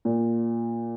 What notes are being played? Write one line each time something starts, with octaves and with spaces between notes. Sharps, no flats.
A#2